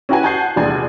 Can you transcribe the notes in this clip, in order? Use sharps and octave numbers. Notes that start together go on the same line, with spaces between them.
C#4 E4 F#4 G4 B4 G#5
F#5 G#5 A5 F#6 G6 C7
F1 A#1 E2 D4 G#5